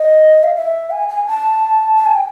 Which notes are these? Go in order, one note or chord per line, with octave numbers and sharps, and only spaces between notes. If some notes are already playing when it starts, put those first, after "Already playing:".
Already playing: D#5
F5
E5
G#5
G#5
A5
A5
G#5
G5